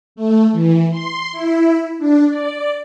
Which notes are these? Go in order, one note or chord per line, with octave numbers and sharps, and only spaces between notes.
A3
E3
C6
E4
D4
D5